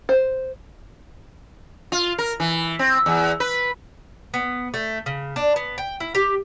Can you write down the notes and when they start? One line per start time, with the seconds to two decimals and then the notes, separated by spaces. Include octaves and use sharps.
0.09 C5
1.92 F4
2.18 A#4
2.40 E3
2.79 C4
3.06 E2
3.40 B4
4.34 B3
4.74 A3
5.06 C#3
5.36 D4
5.56 B3
5.78 G5
6.00 E4
6.15 G4